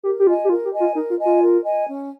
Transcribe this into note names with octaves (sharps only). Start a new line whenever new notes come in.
G4 A#4
G4
F4 D#5 G#5
G4
F4 A#4
G4
D#5 G#5
F4
D#4 A#4
F4
D#5 G#5
F4
A#4
D#5 G#5
C#4